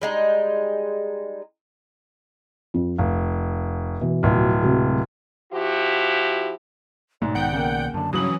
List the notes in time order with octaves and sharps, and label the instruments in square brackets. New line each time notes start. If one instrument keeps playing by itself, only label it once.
[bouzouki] G3 G#3 D#4
[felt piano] F2
[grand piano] F1 [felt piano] F5
[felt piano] B2 E3
[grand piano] D1 [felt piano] B2 F3
[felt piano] C3 F#3 G#3
[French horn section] F3 E4 F#4 G4
[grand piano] G#2 [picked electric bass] B2 G#3 A3 [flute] D5
[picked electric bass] B1 D#3 B3 [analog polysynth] F#5 G5 G6
[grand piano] C#3 A#3
[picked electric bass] F#2 D3 [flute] A5
[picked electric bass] G2 C#3 [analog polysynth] E3 C#4 [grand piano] F#3 F#7 [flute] D#6